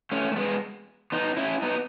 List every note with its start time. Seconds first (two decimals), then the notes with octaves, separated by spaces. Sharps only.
0.12 A3 C#4
0.32 A3
0.36 G#3 B3
1.12 B3 D#4
1.37 C#4 E4
1.62 B3 D#4